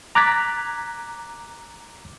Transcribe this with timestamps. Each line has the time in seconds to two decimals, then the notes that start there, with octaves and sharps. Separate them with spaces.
0.15 A#5 D6 F#6 G#6 A6 B6